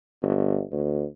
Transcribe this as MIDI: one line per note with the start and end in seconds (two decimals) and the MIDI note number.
0.22 0.62 31
0.72 1.04 38